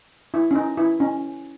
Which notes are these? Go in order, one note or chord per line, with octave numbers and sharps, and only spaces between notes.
E4
C#4
D#4
E4
C#4